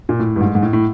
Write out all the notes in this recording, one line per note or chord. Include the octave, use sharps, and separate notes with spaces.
A#2
A2
G2
G#2
G#2
A2
A2